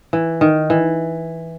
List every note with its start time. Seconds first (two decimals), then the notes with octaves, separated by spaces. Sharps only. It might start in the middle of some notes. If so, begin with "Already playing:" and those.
0.13 E3
0.41 D#3
0.70 E3